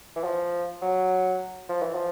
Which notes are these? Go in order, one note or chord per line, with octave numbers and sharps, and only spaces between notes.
E3
F3
F#3
F3
E3
F3